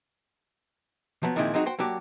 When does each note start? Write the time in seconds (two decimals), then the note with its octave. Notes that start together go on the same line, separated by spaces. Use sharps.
1.23 F3 F#3 B3
1.36 A#2 D#3 F3 G#3 C4 E4
1.54 F#3 G#3 C4 D#4 F4 F#4
1.66 F#4 C5 G5
1.79 F#3 A#3 D4 F#4 G4